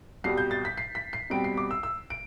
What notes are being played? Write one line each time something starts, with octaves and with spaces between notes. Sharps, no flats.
C2 B2 G3 C7
G6
A6
B6
C7
B6
C7
B2 G3 C4 D7
C7
D6
E6
E6
D7